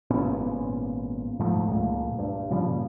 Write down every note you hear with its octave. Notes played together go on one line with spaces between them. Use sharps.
G#1 A#2 B3 C#4
G#2 F3 A3
C#2 A#2
G2
A#2 C#3 F3 G3